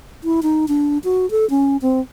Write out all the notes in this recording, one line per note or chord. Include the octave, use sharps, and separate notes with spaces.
E4
D#4
D4
F#4
A4
C#4
C4